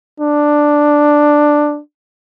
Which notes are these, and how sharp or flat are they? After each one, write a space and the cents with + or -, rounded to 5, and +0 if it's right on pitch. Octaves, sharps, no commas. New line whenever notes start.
D4 +5